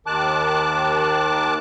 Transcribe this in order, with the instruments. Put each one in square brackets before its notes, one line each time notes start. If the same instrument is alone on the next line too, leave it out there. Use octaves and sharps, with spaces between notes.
[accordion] D#2 D#3 A5 D6 F#6